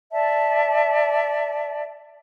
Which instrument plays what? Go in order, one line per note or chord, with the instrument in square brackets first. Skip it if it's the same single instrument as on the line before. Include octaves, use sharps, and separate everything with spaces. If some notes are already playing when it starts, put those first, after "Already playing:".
[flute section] D5 E5 A5